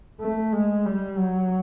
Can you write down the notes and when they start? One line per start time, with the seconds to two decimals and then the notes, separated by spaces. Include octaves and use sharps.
0.20 A3
0.53 G#3
0.85 G3
1.17 F#3